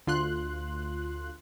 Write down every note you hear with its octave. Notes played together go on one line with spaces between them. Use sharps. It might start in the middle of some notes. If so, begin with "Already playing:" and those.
D2 F4 C6 F#6